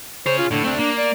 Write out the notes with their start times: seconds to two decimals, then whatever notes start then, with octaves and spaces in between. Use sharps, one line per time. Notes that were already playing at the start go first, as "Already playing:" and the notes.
0.26 G#4 C5 C#5
0.39 F4
0.51 A2 D3
0.64 A3 C4 D4
0.79 A#3 D4
0.98 D5